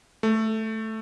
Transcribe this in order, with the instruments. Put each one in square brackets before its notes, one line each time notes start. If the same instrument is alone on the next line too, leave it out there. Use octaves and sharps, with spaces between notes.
[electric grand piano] A3